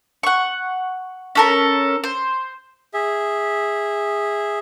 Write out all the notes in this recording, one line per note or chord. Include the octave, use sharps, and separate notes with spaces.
F#5 C#6
C#4 A4 A#4
C5
G#4 E5